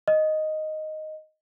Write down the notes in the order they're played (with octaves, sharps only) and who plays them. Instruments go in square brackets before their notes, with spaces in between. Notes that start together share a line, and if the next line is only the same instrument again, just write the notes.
[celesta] D#5